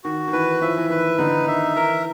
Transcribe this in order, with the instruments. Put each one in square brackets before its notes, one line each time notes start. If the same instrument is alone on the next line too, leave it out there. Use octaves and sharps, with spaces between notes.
[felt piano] D#3 [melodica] F#4
[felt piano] D#3
[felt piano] E3 [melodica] B4
[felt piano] F3 [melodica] E5
[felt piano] E3
[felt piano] D#3 [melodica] B4
[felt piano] D3 [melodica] D#4
[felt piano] D#3 [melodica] E5
[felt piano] E3 [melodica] A#4